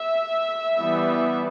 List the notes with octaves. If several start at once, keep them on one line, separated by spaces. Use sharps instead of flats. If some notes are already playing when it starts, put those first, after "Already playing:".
Already playing: E5
E3 G3 B3